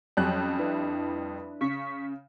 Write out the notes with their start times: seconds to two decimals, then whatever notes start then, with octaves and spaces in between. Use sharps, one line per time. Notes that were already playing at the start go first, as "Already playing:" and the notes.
0.17 F2 F#3 G3 C#4 F#6
0.58 D4 E4 B4
1.61 C#3 C#6 B6